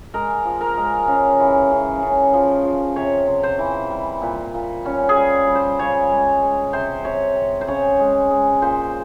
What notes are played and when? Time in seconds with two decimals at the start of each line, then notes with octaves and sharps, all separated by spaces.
0.14 G#3 A#4
0.45 F3
0.61 A#4
0.77 G#3
1.08 C#3
1.39 E3
1.71 C#3
2.02 C#3
2.34 F3
2.64 F3
2.96 C3 C#5
3.27 C3
3.43 C5
3.59 E3
3.90 G3
4.22 A#2
4.54 A#2
4.85 G3 C#4
5.09 G#4
5.17 G3
5.47 G3
5.55 C5
5.79 C#3 C#5
6.11 G#3
6.42 G#3
6.73 C3 C5
7.05 C3 C#5
7.36 C3
7.61 C5
7.67 C#3 C#5
7.99 G#3
8.30 G#3
8.62 A#2 C5